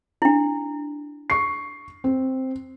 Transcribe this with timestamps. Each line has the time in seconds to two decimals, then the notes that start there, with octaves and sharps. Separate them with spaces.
0.22 D4 E4
1.30 C#6 C7
2.04 C4